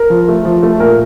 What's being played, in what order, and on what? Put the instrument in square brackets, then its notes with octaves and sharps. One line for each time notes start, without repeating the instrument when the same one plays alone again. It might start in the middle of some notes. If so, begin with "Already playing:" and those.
Already playing: [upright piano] A#4
F3
A3
F3
A3
A#2 A#4